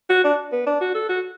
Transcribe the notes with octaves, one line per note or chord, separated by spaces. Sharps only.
F#4
D4
B3
D4
F#4
A4
F#4